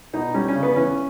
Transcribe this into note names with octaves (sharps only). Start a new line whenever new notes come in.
B2 D#4
G3 C#4
C#4
C#3
B3
E2 C#4